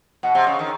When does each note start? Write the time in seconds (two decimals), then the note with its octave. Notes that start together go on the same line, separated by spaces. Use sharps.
0.23 B2 F#5
0.35 C3
0.47 C#3
0.59 D#3